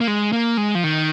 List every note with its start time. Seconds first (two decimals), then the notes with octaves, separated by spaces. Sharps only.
0.01 A#3
0.08 G#3
0.32 A#3
0.57 G#3
0.75 F3
0.84 D#3